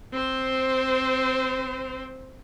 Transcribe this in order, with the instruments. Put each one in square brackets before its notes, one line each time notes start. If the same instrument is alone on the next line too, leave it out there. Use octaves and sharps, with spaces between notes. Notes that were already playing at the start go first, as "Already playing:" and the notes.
[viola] C4 C5